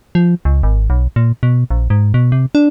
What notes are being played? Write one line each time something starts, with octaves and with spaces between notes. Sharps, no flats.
F3
C#2
G#1
B1
A#2
B2
A#1
G#2
B2
C3
D4